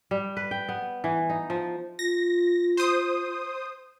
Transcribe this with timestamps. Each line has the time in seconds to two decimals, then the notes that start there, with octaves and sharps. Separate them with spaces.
0.11 G3
0.37 B4
0.51 G5
0.69 B3
1.04 E3
1.30 D#4
1.50 F3
1.99 F4 A#6
2.77 C5 D#6